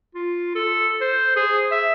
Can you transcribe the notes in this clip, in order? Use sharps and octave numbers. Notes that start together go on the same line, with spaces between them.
F4
A4
C5
G#4
E5